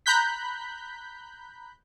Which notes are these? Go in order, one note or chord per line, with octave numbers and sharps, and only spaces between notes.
A#5 B5 F#6 G6 B6